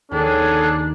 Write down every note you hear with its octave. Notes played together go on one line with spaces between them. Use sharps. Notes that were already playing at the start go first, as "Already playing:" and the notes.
D#2 D4 G#4 A4 C#5